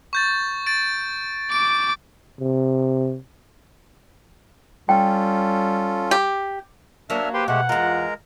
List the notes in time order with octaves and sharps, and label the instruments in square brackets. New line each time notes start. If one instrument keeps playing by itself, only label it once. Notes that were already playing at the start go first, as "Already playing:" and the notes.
[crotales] C#6 G6 A6
A6 D7
[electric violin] D6 [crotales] D7
[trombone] C3
[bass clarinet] G3 [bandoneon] C#4 F4 A4 [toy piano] G5
[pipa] G4
[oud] F#3 A#3 [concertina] D4 E5 F6
[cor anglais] G4 [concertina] B4 C5 C6
[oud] B2 [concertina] G#3 A3 G4 [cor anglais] F#5
[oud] E2 F4 [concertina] G#3 A#4 A#5